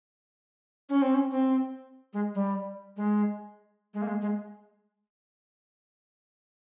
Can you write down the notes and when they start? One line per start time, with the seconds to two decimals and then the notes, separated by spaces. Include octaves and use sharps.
0.89 C#4
1.02 C4
1.14 C#4
1.31 C4
2.13 G#3
2.35 G3
2.97 G#3
3.94 G#3
4.02 A#3
4.08 G#3
4.21 G#3